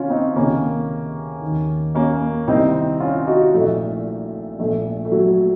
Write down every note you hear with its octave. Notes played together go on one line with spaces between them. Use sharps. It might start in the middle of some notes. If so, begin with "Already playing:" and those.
Already playing: C3 D#3 C#4 F4
C4 D#4
C#2 C3 D#3 A#3 C#4
D#2 D#3
A#3 C#4
C2 C3 D#3 C4 D#4
C#4 F4
D#4 F#4
A#1 A#2 A3
A#1 A#2 A3
A3
F#3